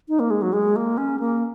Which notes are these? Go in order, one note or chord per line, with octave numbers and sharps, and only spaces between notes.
D#4
A#3
G#3
F#3
G#3
A#3
C#4
A#3